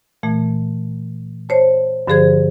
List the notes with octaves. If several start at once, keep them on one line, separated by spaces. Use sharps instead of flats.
A#2 E3 A3
C5 C#5 A5
G2 D3 F3 G#4 C5 G#6